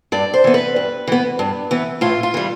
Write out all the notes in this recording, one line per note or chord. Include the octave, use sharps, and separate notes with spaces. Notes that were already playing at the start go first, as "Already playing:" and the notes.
G2 D5
C5
E3 B3
B4
G2
E3 B3
G2
E3 B3
A2 F4
F4
E3 G3